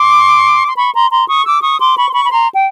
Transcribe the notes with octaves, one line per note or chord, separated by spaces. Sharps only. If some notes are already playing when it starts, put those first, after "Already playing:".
Already playing: C6 D6
C6
B5 C#6
A#5 C6
A#5 C6
C#6 D#6
D6 E6
C#6 D#6
C6 D6
B5 C#6
C6
B5 C#6
B5
A#5 C6
G5